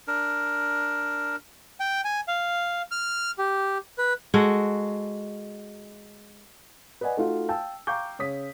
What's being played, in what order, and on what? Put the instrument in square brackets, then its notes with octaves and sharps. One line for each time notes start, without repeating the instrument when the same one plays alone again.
[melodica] D4 A#4
[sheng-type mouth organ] G5
G#5
F5
F6
G4
B4
[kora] G#3 F#4 A4 F#5
[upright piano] B4 D5 D#5 F#5 G#5
A3 D#4 F4 F#4
F5 G5 A5 E6
F5 G5 A#5 C#6 D6 G6
C#3 C#5 D#6 B6